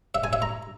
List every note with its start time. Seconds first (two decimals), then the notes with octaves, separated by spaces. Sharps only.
0.15 E5
0.24 G#5
0.33 E5
0.42 A#5